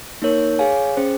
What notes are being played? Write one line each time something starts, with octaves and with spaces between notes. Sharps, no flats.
A#3 D#4 A#4 C#5
G#4 C#5 F5 G#5
C#4 G#4 C5